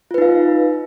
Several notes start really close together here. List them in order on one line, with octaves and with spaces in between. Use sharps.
F4 B4 D#4 F5